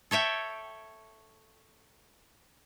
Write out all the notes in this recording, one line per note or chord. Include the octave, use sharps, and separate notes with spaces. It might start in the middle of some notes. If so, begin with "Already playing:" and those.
A4 C#5 E5 G5